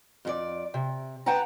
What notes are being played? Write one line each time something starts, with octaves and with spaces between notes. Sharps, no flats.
F2 G#4 D5
C3
B4 F#5 G5 A5 A#5